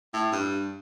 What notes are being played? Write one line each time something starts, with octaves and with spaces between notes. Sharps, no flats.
A2
G2